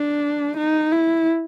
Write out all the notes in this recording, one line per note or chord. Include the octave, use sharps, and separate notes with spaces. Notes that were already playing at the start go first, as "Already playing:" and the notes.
Already playing: D4
D#4
E4